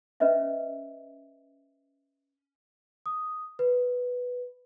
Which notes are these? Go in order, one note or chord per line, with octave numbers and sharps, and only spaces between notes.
C#4 B4 C5 D#5 E5
D#6
B4